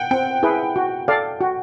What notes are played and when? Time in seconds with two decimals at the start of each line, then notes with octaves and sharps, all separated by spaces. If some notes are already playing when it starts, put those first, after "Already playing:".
Already playing: F#5 G5
0.11 C4 G5
0.43 E4 G#4 B4
0.76 F#4
1.08 A4 D5 F5
1.41 F#4